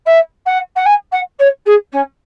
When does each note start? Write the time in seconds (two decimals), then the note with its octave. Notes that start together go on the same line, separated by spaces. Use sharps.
0.06 E5
0.46 F#5
0.76 F#5
0.85 G#5
1.12 F#5
1.39 C#5
1.66 G#4
1.92 C#4